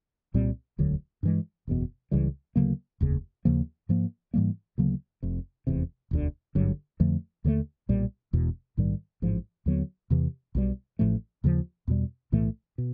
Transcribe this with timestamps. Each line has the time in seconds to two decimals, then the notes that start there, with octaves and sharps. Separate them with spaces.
0.34 C2 A#2 G3 C4
0.78 E1 D2 D3 F#3
1.23 G2 E3 G#3
1.67 F#1 E2 B2
2.11 C#2 C#3 E3 G3
2.56 D2 C#3 F#3 A#3
3.01 F1 D#2 C#3
3.45 D#2 C#3 F3 A#3
3.89 G#2 F3 A#3
4.34 G#2 E3 G3 A#3
4.78 D2 C#3 F#3 A#3
5.23 F1 F2 C3
5.67 F1 E2 C3
6.11 E1 D2 D3
6.55 G#1 G2 D3 F#3
7.00 F2 D3 F3 A3
7.44 D#2 D3 F3 A3
7.89 B1 A#2 G3
8.33 E1 E2 B2
8.77 A#1 G#2 D#3 G3
9.22 A1 G#2 F3
9.66 D#2 D3 F#3 B3
10.10 E2 C3 E3
10.55 B1 B2 G3
10.99 A1 A2 F3 A3
11.44 D#2 C#3 F3
11.88 E2 B2 G3
12.32 B1 A2 E3 A3
12.78 B2